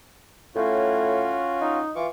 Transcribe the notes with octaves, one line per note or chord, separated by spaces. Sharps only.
A2 C#4 F4 F#4
D#4
E3 F4 C#6 D6